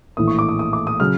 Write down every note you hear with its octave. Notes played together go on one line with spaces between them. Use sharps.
A#1 A2 E3 D#6
C#6
D6
D#6
D#6
D6
D#6
C#3 F#3 F6